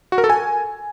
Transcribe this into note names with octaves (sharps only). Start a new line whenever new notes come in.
F#4
A#4
A4
G#5